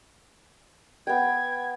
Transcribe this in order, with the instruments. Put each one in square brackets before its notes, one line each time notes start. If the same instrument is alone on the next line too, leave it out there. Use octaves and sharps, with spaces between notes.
[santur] B3 G5 [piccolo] G#6